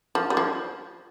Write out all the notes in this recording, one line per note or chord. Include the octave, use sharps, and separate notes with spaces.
F3
G3
F3